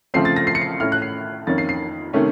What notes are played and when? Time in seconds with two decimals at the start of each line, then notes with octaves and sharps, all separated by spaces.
0.14 C#3 F3 A3 C4 C7
0.25 A6
0.36 A#6
0.47 C7
0.55 C#7
0.62 C7
0.80 A2 A3 C#4 F6
0.92 F#6
1.02 C7
1.47 F2 D#3 A#3 C#4 A6
1.58 C7
1.69 C7
2.13 C3 D#3 A3 C#4